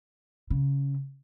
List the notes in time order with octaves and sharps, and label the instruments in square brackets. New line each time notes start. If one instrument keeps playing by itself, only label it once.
[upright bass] C#3